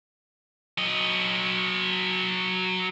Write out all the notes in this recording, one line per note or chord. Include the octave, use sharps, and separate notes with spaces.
F#3 D#5